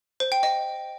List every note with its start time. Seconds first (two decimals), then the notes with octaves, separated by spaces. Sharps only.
0.20 C5
0.32 G5
0.43 D#5